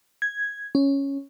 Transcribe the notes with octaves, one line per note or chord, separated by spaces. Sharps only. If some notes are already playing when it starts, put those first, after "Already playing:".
G#6
C#4